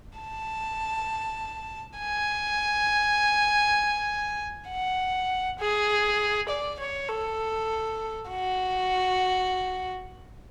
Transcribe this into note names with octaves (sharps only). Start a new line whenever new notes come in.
A5
G#5
F#5
G#4
D5
C#5
A4
F#4